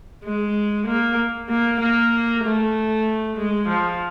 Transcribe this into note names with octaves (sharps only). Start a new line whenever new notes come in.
G#3
A#3
A#3
A#3
A3
G#3
F3